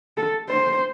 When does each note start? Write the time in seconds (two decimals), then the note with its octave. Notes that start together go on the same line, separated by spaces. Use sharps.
0.18 A4
0.49 C5